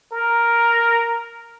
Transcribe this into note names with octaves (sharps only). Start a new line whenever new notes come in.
A#4